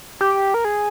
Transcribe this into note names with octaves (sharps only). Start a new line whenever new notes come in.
G4
A#4
G#4